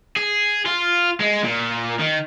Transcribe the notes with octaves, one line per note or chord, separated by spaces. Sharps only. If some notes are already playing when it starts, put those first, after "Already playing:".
G#4
F4
G#3
A#2
D#3